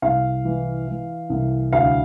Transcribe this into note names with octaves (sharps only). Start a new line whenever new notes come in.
C2 F5
E3
E3
C2
D2 F5